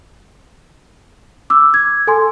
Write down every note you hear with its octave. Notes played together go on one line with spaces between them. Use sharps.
D6 E6
G#6
A4 G#5 C6